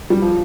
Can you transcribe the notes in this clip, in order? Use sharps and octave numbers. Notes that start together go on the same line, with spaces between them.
G3
F3